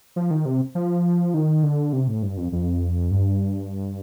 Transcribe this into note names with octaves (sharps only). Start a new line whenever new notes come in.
F3
D#3
C3
F3
D#3
D3
C3
A2
G2
F2
F2
G2